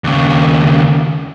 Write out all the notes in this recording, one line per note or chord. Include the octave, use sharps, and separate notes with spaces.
D#2 C#3